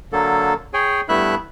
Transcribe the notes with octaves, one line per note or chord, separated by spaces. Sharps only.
D3 F#3 A#3 A4
G#4 C#5 G5 G#5
G2 A3 B3 E4 E5 F#6